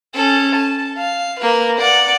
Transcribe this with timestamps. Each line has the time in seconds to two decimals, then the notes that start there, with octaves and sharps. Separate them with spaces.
0.14 C#4 A4
0.56 A5
0.98 F5
1.40 A#3 B4
1.78 D5 F#5